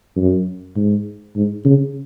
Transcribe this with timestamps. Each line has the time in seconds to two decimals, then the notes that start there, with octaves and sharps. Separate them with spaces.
0.16 F#2
0.76 G#2
1.35 G#2
1.65 C#3